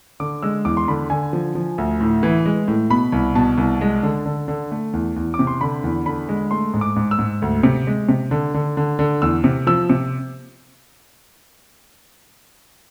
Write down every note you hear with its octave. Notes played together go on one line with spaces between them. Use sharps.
D3 D6
G#3 E6
E2 D6
C6
D3 B5
D3 G#5
F3
F3
D2
A2
E3
G#3
A2
B2 B5
C2
B2 A5
C2
G#3
D3
D3
D3
A3
E2
E2
D6
C3
C6
D3 B5
E2
D3 B5
G#3
A3 C6
G#2
D6
G#2
E6
G#2
D2
C3
G#3
C3
D3
D3
D3
D3
E2 E6
C3
F3 E6
C3